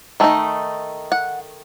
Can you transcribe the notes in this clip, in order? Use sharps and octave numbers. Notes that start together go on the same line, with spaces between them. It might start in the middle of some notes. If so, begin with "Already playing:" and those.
D#3 A3 D#4
F#5